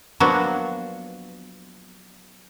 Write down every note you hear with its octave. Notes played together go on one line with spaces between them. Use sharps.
F3 F#3 A#3 B3 D4 F#4